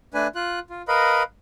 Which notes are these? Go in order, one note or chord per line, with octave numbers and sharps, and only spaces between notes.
A3 D4 B4 G#5
F4 F#6
F4
A#4 B4 D#5 F5 B5